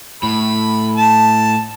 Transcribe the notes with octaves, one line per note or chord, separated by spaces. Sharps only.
A2 B5
A5